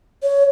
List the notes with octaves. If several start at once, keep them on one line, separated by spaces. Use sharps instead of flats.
C#5